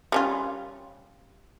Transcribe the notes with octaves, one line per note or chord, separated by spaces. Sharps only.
G3 C#4 F4